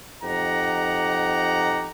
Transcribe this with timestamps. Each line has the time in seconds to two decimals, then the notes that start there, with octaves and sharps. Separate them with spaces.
0.23 F2 D#4 G4 F#5 A#5